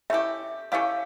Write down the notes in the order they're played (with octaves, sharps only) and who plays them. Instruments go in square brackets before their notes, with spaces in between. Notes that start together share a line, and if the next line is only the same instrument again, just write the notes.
[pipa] A3 C#4 E4 G4 [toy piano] E5
[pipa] A3 C#4 E4 G4 [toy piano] F5